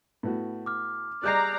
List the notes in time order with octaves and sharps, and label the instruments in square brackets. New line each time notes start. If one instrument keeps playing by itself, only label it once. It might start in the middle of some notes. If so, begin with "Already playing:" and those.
[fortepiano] A2 B3 F#4
[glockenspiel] D6 F6
[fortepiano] G3 G#4 D#5 [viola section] D5 A#5 [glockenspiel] F#6 G6 C7